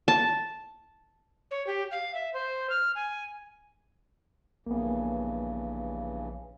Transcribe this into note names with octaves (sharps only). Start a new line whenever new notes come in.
A5
C#5
G4
F5
E5
C5
F6
G#5
A#1 G2 C#3 E3 A#3 B3